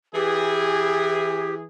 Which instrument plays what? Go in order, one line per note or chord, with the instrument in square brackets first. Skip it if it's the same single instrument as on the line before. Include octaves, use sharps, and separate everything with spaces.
[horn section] E3 G#4 [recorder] G4